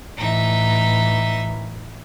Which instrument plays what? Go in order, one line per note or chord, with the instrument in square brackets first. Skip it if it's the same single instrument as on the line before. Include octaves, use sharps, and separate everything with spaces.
[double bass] A2 E3 [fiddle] D#4 E5